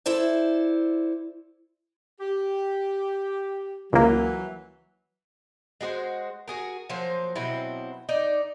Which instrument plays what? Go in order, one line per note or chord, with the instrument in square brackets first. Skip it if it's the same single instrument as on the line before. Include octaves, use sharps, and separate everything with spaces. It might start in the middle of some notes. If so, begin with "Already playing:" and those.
[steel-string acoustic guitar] E4 A4 C5 D5
[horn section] G4
[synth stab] C#2 A#3 [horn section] E3 F#3
[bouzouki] G#3 F#4 G4 C5
F#4 G#4 A#4
F3 F#3 A#3 C5
B2 F#3 C4 E4
D#4 D5